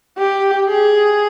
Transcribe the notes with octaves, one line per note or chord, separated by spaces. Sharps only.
G4
G#4